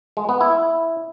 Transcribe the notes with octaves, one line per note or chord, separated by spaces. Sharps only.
G#3
B3
E4